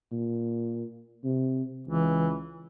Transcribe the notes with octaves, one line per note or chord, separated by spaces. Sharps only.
A#2
C3
C#2 E3